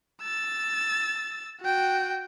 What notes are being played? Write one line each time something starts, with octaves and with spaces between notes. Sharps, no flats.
E6 A6
F#4 G5